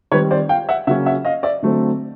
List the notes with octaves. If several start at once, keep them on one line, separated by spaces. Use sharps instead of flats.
D#3 G3 C4 B4 C#5
C5 D5
F5 G5
E5 F#5
C#3 F#3 A#3 C#4 E5 F#5
E5 F#5
D#5 F5
D5 E5
D3 F#3 A3 C4